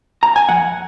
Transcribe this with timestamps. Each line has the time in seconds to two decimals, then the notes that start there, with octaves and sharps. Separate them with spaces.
0.23 A#5
0.36 G#5
0.49 F2 F#5